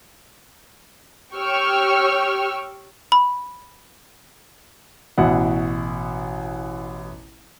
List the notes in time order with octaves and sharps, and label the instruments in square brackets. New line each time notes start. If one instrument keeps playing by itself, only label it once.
[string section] G4 C#5 G5 C#6 E6 F6
[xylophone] B5
[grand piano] A1 B2 E4 F#5